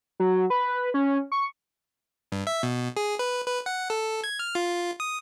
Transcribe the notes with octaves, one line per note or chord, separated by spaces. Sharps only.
F#3
B4
C#4
C#6
G2
E5
B2
G#4
B4
B4
F#5
A4
G#6
F6
F4
D#6